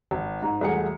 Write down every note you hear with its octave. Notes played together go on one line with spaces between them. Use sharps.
G#1
G#2
E1 C2 A3 G#4 F#5 C#7